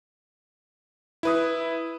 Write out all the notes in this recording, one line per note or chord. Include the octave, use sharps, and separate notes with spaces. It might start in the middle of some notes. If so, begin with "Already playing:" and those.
E4 B4 D#6